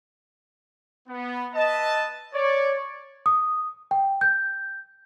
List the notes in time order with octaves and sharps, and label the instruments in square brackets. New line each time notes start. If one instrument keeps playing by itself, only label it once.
[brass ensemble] B3
[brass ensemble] B4 E5 A5 [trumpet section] D#5
[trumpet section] C#5 [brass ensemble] D5
[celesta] D#6
G5
G6